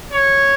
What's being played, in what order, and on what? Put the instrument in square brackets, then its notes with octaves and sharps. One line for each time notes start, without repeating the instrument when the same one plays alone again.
[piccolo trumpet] C#5